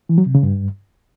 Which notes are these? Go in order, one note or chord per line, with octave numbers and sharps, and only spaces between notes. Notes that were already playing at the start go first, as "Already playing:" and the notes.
E3
F#3
C3
C#3
G2